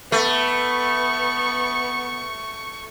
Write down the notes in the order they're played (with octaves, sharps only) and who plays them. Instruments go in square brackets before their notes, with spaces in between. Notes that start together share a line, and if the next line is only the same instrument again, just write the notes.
[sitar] A3 [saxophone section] B3 [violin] C#6